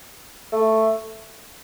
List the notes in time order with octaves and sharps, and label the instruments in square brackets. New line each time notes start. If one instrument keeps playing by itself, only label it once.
[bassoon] A3